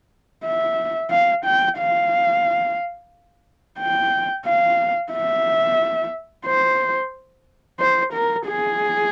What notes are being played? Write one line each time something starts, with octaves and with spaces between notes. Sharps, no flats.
E5
F5
G5
F5
G5
F5
E5
C5
C5
A#4
G#4